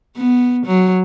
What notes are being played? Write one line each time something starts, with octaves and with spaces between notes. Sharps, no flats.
B3
F#3